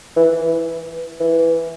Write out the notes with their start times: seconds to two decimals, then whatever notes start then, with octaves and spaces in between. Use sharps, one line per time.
0.16 E3
0.42 E3
1.20 E3